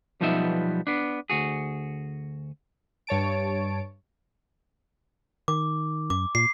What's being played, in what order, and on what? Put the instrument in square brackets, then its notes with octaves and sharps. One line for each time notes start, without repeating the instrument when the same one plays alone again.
[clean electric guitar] B1 F3 G3 B3 D#4 E5
B3 D4
D2 F#4 G#4
[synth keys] G2 C#5 A5 D7
[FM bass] D#3 [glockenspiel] D6
[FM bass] F#2 [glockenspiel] D6
[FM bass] A#2 [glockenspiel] C7